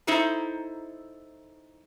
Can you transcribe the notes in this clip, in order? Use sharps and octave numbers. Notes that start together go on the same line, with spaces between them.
D#4 E4 A4 C5 A#5